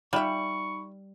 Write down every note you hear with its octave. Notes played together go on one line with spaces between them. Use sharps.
G3 D#4 F4 E5 B5 C#6 F#7